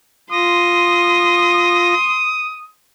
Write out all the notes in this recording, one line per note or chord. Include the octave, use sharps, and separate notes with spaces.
F4 C6 D#6 A#6